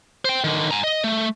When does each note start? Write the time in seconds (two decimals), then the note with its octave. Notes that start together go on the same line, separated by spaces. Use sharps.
0.25 C5 G5
0.44 D3 D#3
0.71 G#5 A#5
0.84 D#5
1.04 A3